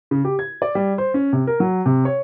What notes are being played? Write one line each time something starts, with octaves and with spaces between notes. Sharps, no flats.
C#3
G4
G#6
D5
G3
C5
C#4
C3
A#4
F#3
C3
C#5